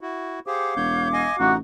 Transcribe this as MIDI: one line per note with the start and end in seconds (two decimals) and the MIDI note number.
0.01 0.39 64
0.01 0.39 66
0.47 0.74 67
0.47 0.74 68
0.47 0.74 72
0.47 1.49 77
0.47 1.49 78
0.47 1.49 86
0.77 1.27 28
0.77 1.08 73
0.77 1.08 91
1.13 1.36 75
1.13 1.36 80
1.39 1.59 33
1.39 1.57 48
1.39 1.57 63
1.39 1.53 66